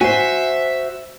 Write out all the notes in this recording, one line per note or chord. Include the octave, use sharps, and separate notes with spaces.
F#4 C5 E5 G#5